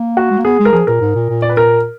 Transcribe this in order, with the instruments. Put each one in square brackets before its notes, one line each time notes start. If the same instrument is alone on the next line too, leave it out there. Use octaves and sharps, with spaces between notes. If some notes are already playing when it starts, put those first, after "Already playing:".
Already playing: [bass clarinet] A#3
[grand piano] F#4
[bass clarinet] G#3
A#3
[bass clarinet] B3 [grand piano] G#4
[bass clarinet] G#3
[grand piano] A#4
[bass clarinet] F3 [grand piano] G#4
[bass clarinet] A#2 [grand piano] A#4
[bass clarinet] G#2
A#2
A#2
[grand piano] D5
B4
A#4